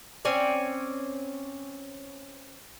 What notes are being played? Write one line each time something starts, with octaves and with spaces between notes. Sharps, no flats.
C4 C#4 C#5 D5